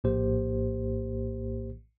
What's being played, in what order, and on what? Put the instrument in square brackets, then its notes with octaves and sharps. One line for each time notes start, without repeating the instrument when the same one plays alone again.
[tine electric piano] A#1 A2 A#3 G4 C5